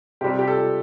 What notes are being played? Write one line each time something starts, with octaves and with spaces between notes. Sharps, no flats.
C3 G3 G4
G4
A4